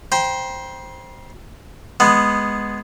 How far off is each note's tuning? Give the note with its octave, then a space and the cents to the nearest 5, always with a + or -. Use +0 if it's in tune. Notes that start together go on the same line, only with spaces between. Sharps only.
C5 +0 G5 +0 A#5 +45
G#3 +0 B3 +0 F#5 +0